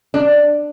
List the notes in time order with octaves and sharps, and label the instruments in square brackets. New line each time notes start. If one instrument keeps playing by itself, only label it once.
[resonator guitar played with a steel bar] D4